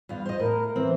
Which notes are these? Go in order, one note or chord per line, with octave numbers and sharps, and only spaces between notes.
E2 G2 F4
C5 D#5
A2 A#4
E3 C4